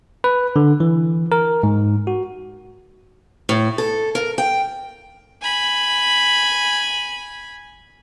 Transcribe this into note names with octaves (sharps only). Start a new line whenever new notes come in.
B4
D3
E3
A#4
G#2
F#4
A2
A4
A#4
G5
G#5 B5